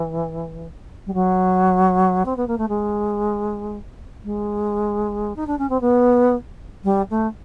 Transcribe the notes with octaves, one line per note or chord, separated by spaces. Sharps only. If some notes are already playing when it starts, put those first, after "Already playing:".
Already playing: E3
G3
F#3
C4
B3
A#3
A3
G#3
G#3
D#4
D4
C#4
C4
B3
G3
A3